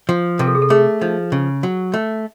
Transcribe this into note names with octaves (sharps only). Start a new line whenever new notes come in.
F3
C3 A#4
A4
G#4
A4
A3 G#4
F3 D#4
C#3
F#3
A3